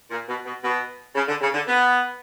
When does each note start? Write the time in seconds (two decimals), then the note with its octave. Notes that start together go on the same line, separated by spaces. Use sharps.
0.11 A#2
0.28 B2
0.46 B2
0.63 B2
1.15 C#3
1.28 D3
1.41 C#3
1.54 D3
1.67 B3